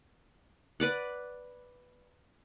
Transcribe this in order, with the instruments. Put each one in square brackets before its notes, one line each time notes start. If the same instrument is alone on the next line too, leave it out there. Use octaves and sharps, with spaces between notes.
[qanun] B4 D5 F#5